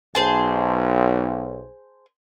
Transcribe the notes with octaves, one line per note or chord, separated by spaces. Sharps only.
B1 G#4 C5 A5